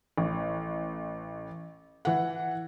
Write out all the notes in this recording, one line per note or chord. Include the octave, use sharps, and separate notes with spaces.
A1
E3 F#5